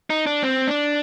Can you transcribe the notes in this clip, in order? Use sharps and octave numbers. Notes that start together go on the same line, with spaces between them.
D#4
D4
C4
D4